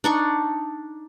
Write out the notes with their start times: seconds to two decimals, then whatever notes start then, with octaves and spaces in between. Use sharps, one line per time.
0.04 D4 D#4 C#6